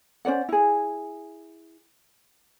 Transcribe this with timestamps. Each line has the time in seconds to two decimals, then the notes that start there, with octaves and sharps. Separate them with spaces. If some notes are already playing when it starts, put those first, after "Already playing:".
0.25 C#4 C5 D5 F#5
0.49 E4 G#4